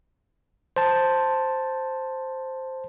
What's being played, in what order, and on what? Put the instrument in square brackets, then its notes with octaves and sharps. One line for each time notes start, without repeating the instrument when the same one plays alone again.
[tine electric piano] C5 A5